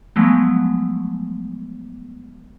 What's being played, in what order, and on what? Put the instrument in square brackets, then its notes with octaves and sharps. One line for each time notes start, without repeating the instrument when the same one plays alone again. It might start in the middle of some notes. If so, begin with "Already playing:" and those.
[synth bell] F3 F#3 G#3 A3 B3